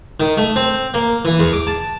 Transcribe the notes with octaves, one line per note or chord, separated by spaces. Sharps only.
D#3
A3
C4
A#3
E3
E2
D6
A5